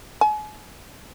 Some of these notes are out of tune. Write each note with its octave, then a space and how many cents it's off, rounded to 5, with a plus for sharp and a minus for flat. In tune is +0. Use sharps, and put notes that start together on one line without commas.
G#5 +40